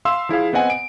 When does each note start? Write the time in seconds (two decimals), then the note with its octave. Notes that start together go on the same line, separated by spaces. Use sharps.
0.05 E5 F5 C6 E6
0.29 F3 E4 G#4 F5
0.53 B3 C4 D#5 F#5 G#5
0.70 D7